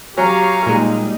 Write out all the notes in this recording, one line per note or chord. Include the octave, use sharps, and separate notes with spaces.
F#3 G4 C#5 F5 G#5 A#5 C#6
A#2 G3 G#3 A#3 D#4